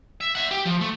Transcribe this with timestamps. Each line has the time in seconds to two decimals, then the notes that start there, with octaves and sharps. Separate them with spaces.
0.21 E5
0.35 E5 F#5
0.51 G4
0.66 F3
0.81 A3